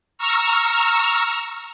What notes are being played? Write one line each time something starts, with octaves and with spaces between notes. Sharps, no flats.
A#5 C#6 E6 F6